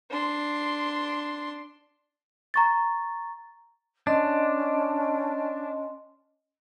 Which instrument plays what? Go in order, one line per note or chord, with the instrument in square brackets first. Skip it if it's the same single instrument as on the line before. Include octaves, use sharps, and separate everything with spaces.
[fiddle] D4 C6
[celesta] A#5 C#6 A6
[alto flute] C#4 [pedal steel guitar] D4 [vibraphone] D#5 C6